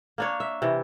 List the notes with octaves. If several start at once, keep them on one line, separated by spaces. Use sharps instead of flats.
A#3 D4 C#5
E5
C3 E3